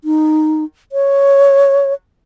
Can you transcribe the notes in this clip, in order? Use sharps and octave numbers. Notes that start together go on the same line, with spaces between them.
D#4
C#5